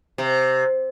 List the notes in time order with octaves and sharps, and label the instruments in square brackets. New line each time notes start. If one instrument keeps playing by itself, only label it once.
[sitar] C3